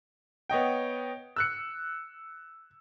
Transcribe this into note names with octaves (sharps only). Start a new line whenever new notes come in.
B3 C#5 D#5 G5
E6 F#6 C#7